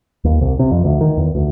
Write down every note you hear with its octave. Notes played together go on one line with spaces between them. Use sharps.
D#2
C2
C3
F2
D2
D#3
E2
D2